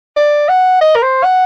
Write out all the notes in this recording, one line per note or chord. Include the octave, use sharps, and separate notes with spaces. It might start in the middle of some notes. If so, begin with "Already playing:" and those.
D5
F#5
D#5
A#4
C5
F#5